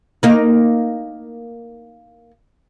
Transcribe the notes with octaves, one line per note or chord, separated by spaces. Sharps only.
A#3 D#4